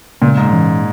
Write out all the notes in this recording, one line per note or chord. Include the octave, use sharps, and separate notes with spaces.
A#2 C#3 G#3 B3
G#2
C#3 E3 A#3 C#4